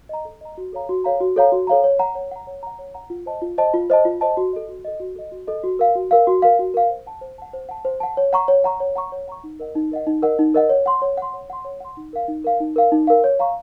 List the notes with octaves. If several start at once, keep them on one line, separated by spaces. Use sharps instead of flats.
D#5 A#5
A4
D#5 A#5
F#4
A4 C#5 F5 A#5
F#4
A4 C#5 F5 A#5
F#4
A4 C#5 F5 A#5
F#4
A4 C#5 F5 A#5
C#5
F#5 A#5
C#5
F#5 A#5
C#5
F#5 A#5
C#5
F#5 A#5
F4
C5 D#5 A5
F4
C5 D#5 A5
F4
C5 D#5 A5
F4
C5 D#5 A5
F#4
A4 D#5
F#4
A4 D#5
F#4
A4 D#5
F#4
A4 D#5
F#4
A#4 F5
F#4
A#4 F5
F#4
A#4 F5
F#4
A#4 F5
C5
F#5 A5
C5
F#5 A5
C5
F#5 A5
C5
F#5 A5
C#5
F#5 A#5 C#6
C#5
F#5 A#5 C#6
C#5
F#5 A#5 C#6
C#5
F#5 A#5 C#6
D#4
A#4 D#5 F#5
D#4
A#4 D#5 F#5
D#4
A#4 D#5 F#5
D#4
A#4 D#5 F#5
C#5
F#5 C6
C#5
F#5 C6
C#5
F#5 C6
C#5
F#5 C6
D#4
A#4 F5
D#4
A#4 F5
D#4
A#4 F5
D#4
A#4 F5
C#5
F5 A#5 C#6